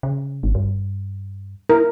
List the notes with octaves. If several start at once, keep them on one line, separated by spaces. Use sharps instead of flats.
C#3
G#1
G2
E4 A#4